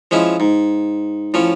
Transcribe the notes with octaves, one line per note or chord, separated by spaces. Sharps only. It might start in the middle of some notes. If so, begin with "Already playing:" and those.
F3 G#3 C#4 E4
G#2
A2 F3 C#4